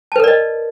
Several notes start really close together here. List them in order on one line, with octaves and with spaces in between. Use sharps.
A5 B4 A#4 D5 D#5